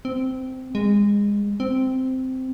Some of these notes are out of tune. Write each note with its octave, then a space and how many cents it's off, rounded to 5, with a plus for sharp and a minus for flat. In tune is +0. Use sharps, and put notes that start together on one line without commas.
C4 -15
G#3 -25
C4 -10